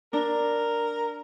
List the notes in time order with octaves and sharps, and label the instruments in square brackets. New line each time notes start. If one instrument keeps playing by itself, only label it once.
[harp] D4 [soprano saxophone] A#4